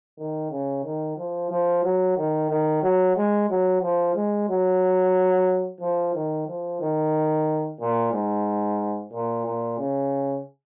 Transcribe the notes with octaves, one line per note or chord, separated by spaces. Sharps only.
D#3
C#3
D#3
F3
F3
F#3
D#3
D#3
F#3
G#3
F#3
F3
G#3
F#3
F3
D#3
F3
D#3
A#2
G#2
A#2
A#2
C#3